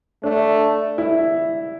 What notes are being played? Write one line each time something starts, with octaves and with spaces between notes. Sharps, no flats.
A3 D4
E4